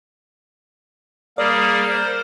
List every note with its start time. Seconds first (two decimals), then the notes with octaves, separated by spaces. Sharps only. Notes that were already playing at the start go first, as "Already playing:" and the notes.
1.38 G3 A#3 G#4 A#4 D5
1.90 C5